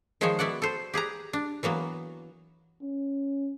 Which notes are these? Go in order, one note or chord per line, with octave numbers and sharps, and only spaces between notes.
D#3 F3 G#3 G#4 C5 C#5
B3 E4 F#4 D5 F#5
A4 C5
G4 G#4 B4 A#5
D4
E3 F#3 A#3 B3
C#4